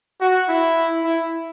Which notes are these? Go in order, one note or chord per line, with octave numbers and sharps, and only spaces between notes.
F#4
E4
E4